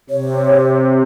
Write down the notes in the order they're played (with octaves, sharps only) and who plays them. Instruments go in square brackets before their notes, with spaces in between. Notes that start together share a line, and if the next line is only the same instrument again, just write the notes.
[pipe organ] C3 [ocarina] C#5